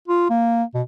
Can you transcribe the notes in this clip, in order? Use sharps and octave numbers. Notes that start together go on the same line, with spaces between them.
F4
A#3
B2